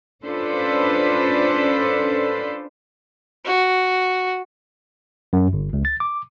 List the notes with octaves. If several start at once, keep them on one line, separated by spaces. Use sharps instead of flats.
C#4 D4 F4 A4 B4 C5
F#4
F#2
G1
C#2
A6
D6